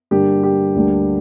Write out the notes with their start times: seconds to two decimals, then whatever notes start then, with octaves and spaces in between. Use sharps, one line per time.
0.11 G2 D3 G3 A#3 G4
0.43 G4
0.75 D2 D3 G3 A#3